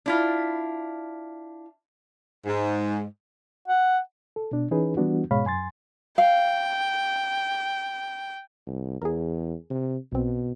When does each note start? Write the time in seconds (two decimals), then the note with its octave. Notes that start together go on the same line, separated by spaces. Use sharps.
0.06 D4 E4 F4
2.46 G#2
3.68 F#5
4.36 A4
4.51 B2 D4
4.71 E3 C#4 D#4 G#4 B4
4.97 E3 G3 B3 D4 F#4
5.31 G#2 B2 G#3 C#5 F5 B5
5.45 F#2 G#5 C6 A6
6.18 F5 G5
8.67 C2
9.02 E2 G#4 A#4
9.70 C3
10.12 B1 B2 C4